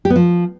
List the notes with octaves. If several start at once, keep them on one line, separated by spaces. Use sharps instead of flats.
G4
B3
F3